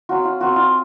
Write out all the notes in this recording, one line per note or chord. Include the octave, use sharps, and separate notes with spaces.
F#3 C4 F4 F#4
F4
F#3 C4 F4 F#4
F4